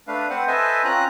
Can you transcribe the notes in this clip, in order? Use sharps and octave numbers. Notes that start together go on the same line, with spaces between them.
A3 D4 B4 F5
C4 B4 C5 F#5
A4 B4 C5 D#5 E5 G#5
C4 C#4 F4 A#5 F#6